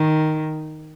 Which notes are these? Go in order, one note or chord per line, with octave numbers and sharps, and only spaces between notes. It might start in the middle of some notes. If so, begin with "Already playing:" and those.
Already playing: D#3